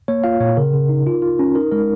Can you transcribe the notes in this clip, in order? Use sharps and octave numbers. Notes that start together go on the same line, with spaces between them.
A#3 C#5
F4 F5
A#2 C#5
C#3 A#4
C#3
D#4
F4
F4
C#4
D#4 A#4
G#3 A#4